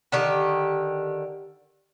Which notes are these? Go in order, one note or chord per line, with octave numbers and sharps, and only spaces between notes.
D3 D#3 G4